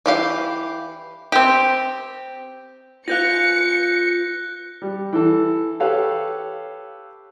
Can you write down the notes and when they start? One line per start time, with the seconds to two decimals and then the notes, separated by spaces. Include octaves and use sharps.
0.06 E3 G4 F5
1.32 C4 G4
3.08 F4 B4 F5 F#6 G6 A#6 C#7
4.82 G3
5.13 E3 A4
5.80 G4 A4 B4 C#5 F5